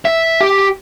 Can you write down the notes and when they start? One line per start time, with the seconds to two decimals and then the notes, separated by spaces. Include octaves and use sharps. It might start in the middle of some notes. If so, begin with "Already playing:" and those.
0.05 E5
0.41 G4